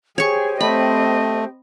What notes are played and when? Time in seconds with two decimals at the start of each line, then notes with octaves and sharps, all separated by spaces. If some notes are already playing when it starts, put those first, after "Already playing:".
0.18 G4 G#4 C5 C#5 G5 C#6
0.61 A3 C4 D#5 B5